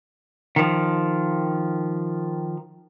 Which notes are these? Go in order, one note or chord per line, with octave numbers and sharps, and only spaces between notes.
D#3 F3